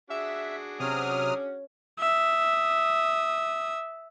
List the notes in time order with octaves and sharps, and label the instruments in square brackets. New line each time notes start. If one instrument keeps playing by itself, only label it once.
[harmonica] D4 F#4 G#4 [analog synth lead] E5
[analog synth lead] C3 [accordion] F#3 D#6 F6 [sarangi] C#4
[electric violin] E5 D#6